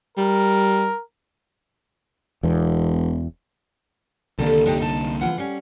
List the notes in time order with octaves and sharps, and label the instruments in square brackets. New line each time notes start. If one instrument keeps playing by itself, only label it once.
[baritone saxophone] G3 [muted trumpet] A#4
[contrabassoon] E1 [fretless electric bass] E2
[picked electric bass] C2 D3 A#3 [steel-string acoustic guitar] D#3 G3 A4
[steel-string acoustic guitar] D4 D#4 G4
D#4 D#5 A5
E3 F4 F#5
G3 C#4